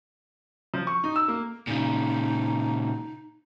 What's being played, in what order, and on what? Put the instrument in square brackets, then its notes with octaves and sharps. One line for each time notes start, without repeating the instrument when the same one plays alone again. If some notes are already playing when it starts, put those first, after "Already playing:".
[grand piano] F3
C#6
D#4
E6
A#3
[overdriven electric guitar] A#2 C#3 [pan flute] D#4